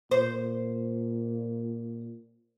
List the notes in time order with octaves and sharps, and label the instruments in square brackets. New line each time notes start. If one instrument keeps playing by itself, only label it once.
[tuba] A#2 [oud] C5